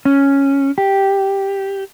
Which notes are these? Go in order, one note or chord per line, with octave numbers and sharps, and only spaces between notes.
C#4
G4